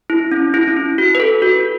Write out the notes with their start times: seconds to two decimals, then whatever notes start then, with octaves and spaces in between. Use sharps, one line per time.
0.10 E4
0.32 C#4
0.54 E4
0.67 C#4
0.77 E4
0.98 F#4
1.15 B4
1.20 A4
1.42 F#4